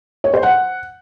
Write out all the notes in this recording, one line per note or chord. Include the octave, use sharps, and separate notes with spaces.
C#5
C5
F#5